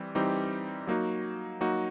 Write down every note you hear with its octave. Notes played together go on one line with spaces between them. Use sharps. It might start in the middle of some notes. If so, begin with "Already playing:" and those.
Already playing: E3 G3 C4
E3 G3 C4 D#4 G4
F#3 A#3 D#4 F#4
F#3 A#3 D#4 F#4